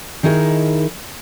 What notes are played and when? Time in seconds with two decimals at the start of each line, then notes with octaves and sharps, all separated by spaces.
0.23 D#3 D#4 E4 G#4 A#4